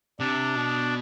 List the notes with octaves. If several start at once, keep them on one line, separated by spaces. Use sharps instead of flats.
C3 D4
B2